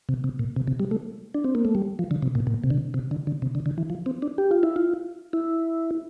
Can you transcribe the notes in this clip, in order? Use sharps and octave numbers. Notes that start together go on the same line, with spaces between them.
C3
C3
A#2
C3
C3
G3
A3
D4
C4
A#3
A3
G3
F3
D3
C3
A#2
A#2
C3
D3
C3
D3
D3
C3
D3
D3
E3
F3
C4
D4
G4
F4
E4
F4
E4